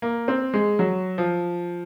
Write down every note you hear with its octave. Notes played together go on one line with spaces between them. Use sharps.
A#3
C4
G#3
F#3
F3